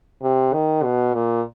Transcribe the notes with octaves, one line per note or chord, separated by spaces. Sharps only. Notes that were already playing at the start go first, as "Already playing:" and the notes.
C3
D#3
B2
A#2